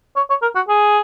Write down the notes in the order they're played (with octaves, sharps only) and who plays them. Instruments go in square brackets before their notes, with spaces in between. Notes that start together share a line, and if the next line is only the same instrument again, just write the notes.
[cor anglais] C#5
C#5
A#4
F#4
G#4